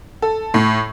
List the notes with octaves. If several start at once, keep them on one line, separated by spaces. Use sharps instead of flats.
A4
A2